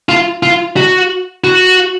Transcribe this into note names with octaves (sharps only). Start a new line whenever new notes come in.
F4
F4
F#4
F#4